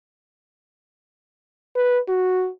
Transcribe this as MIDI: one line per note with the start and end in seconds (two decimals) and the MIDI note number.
1.76 1.98 71
2.08 2.49 66